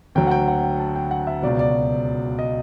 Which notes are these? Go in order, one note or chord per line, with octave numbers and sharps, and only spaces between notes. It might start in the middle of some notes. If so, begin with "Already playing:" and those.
D2 D3 F#3 G5
F#5
G5
F#5
G5
A5
G5
F#5
E5
C#2 B2 F#3 D5
D5
D#5